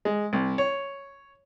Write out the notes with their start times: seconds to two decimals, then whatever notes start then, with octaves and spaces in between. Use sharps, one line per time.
0.05 G#3
0.33 C2
0.58 C#5